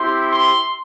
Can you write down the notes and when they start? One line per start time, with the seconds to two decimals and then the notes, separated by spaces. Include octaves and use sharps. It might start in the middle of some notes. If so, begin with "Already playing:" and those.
Already playing: C4 E4 G4 C6
0.32 C6